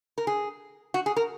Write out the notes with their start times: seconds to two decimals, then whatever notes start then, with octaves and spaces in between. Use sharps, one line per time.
0.18 A#4
0.27 G#4
0.94 F#4
1.06 G#4
1.16 A#4